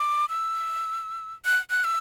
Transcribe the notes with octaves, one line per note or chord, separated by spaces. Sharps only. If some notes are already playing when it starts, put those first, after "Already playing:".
Already playing: D6
E6
F#6
F#6
E6